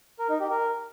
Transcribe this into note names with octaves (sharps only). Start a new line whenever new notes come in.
A#4
D#4
G4
A#4